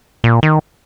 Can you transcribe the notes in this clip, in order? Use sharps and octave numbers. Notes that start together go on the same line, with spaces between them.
A#2
D#3